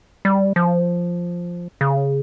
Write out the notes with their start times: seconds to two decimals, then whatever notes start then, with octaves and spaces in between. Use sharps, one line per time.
0.25 G3
0.56 F3
1.81 C#3